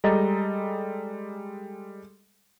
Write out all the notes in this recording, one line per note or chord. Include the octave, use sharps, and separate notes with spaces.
G3 G#3 A4 D#5 A#5 A6